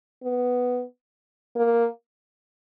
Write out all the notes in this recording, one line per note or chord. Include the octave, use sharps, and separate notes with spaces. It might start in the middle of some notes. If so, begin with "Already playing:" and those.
B3
A#3